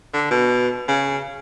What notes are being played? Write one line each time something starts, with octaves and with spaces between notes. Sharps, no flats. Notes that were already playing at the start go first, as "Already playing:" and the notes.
D3
B2
C#3